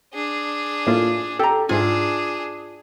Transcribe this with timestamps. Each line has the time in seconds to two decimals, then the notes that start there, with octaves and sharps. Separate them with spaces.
0.14 D4 G#4
0.87 A2 A#3 F4
1.39 G4 A4 A#5
1.69 G#2 D4 F4 G#4 E5 G#5